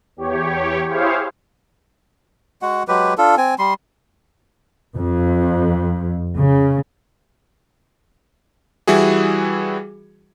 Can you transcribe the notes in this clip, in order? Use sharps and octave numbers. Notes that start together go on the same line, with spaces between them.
E2 G4 C#5
E4 G4 G#4 C5 C#5 F5
G#3 F#4 F#5
F#3 G#3 G4 B4
D4 F4 A4
C4 G#5
G3 C6
F2
C#3
E3 G3 E4 F#4 G#4